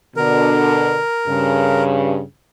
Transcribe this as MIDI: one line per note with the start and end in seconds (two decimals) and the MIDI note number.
0.17 0.99 47
0.17 0.99 50
0.17 1.83 70
1.28 2.21 43
1.28 2.21 49